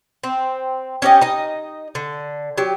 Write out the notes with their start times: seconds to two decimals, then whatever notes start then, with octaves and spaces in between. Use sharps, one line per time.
0.23 C4
1.02 C#4 G4 D5 D#5
1.21 D#4 D#5
1.95 D3
2.58 F#3 G4